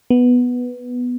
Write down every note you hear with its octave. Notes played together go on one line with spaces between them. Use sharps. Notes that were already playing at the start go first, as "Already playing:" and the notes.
B3